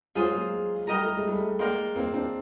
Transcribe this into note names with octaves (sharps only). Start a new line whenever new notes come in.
F#3 G#3 F4 G#4 C5
G#3 A#3
G3 A3 A#4 D#5 G5 A#5
A3
G#3
G3 A3
G#3 A#3 A#4 D5 G5 C6
A#3 C4
C4 D4